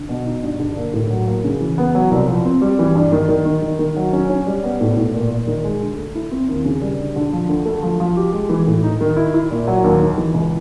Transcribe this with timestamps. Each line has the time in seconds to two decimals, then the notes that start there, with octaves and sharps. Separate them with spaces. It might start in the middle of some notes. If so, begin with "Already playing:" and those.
Already playing: D3
0.09 B2
0.26 D#4
0.43 G2
0.60 D3
0.77 A#3
0.94 A2
1.11 F#3
1.28 A#3
1.44 C#3
1.61 E3
1.78 B3
1.95 F#3
2.11 C2
2.27 F3
2.45 C4
2.61 G3
2.79 E3
2.95 G2
3.12 D#3
3.29 D#3
3.45 D#3
3.62 D#3
3.79 D#3
3.96 F#3
4.13 C#4
4.30 C#4
4.47 G3
4.63 B3
4.81 A2
4.97 A2
5.14 A#2
5.30 A#2
5.47 D#3
5.64 G#3
5.82 D3
5.97 A3
6.15 E4
6.31 C4
6.49 D#2
6.65 C#3
6.82 G3
6.99 D3
7.16 D3
7.32 F3
7.49 D2
7.65 A3
7.83 F3
8.00 F3
8.17 G4
8.33 G#3
8.49 E3
8.67 A2
8.83 D#4
9.01 D#3
9.17 E4
9.34 E4
9.51 A#2
9.68 F#3
9.84 D#2
10.01 D#3
10.18 E3
10.34 C#2